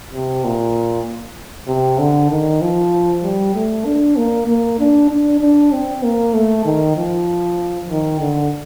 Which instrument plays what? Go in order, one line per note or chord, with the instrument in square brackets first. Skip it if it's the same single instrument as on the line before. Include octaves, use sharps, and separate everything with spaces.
[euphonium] C3
A#2
C3
D3
D#3
F3
G3
A3
D4
A#3
A#3
D4
D4
D4
C4
A#3
A3
D#3
F3
D#3
D3